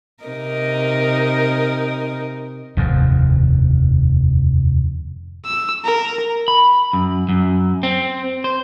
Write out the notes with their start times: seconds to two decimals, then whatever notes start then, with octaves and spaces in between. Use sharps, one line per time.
0.24 C3 D#4 A#4
2.77 F1 D#2 G#2
5.46 E6
5.85 A#4
6.48 B5
6.93 F#2
7.29 F#2
7.83 C4
8.44 C5